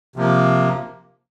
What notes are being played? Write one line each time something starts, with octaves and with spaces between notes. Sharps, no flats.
C3 F3 A#3